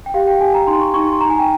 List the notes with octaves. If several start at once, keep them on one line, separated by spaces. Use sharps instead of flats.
G5
G4 F5
G5
G4 G#5
A#5
D#4 C6
C#6
D#4 C#6
C6
D#4 A#5
G#5
G5